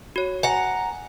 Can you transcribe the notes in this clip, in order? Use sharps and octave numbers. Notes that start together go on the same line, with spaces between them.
F#4 C#5
F#5 G#5 A#5